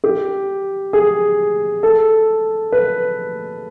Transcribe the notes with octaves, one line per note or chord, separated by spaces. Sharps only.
G4
G#4
A4
B4